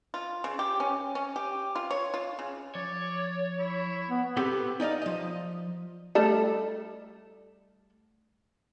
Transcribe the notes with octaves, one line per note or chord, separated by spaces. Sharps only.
F4
C#3
G4
C#4
C#4
G4
F4
C#5
F4
C#3
F3 C#5 D5
E4
B3
B3 C4 G4 A4 B4
D#4 D5 D#5 F5
F3 D#5
G3 A3 A4